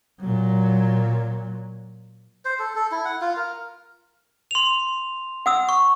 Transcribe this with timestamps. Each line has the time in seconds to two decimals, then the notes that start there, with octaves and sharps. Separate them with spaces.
0.21 A#2 F#3
2.45 C5
2.59 A4
2.75 A4
2.91 E4
3.05 F#5
3.21 F4
3.37 A#4
4.51 C6 F7
5.46 F#5 D#6 E6
5.69 C#6